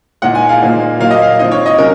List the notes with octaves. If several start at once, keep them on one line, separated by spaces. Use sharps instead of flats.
A#2 G#3 D#4 F#5
G#5
F5
A#2 F3 A#3 D#4
A#2 F#3 A#3 F5
D#5
F5
F3 C4 D#4 D#5
C#5
D#5
C3 F#3 C#4 A#4